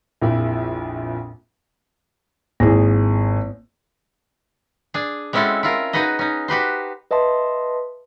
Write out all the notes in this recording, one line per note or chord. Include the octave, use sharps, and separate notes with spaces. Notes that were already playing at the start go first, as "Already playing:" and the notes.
A#1 F2 A#2 E4
G#1 A#3 E4 G#4
D4 G#4
G#3 C4 C#4 E4 F#4 A4
E4 F4 A#4
D#4 F#4 G#4 B4 D#5
C#4 D#4
F#4 G4 B4 C5
B4 D#5 E5 A5 C6